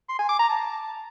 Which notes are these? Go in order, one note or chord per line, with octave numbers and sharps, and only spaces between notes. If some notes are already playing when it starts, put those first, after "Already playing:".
C6
G#5
D6
A#5
A5